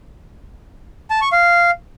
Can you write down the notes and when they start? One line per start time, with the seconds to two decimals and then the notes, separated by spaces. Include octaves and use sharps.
1.10 A5
1.21 C#6
1.32 F5